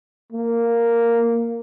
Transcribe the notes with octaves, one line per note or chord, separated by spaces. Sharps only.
A#3